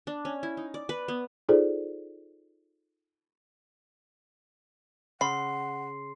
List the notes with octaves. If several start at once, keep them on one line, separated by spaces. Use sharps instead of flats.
D4
C#4
E4
D#4
D5
B4
B3
D#4 F4 G#4 A4 C5 D5
C#3 F#5 B5 C6 C7